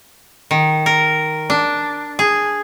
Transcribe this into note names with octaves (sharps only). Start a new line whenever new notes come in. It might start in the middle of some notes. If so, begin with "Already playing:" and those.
D#3
A#4
D4
G#4